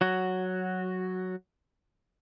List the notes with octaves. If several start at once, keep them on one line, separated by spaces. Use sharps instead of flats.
F#3 F#4